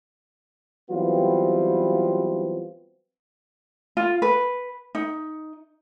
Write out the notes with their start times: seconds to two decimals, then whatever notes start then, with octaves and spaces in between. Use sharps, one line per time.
0.91 E3 F#3 G3 B3 C4 F4
3.97 F4
4.22 B4
4.95 D#4